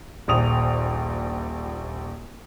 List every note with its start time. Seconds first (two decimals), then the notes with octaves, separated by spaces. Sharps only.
0.28 D#1 A#1 D#6 F7